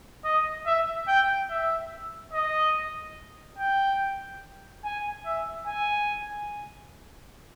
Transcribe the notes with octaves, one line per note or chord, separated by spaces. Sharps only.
D#5
E5
G5
E5
D#5
G5
G#5
E5
G#5